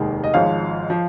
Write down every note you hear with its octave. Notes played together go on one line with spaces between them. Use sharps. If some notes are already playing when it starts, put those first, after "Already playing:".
Already playing: F1 D#2 D#3 G#3
D#5
G#1 G#2 F3 C#5 F5
F3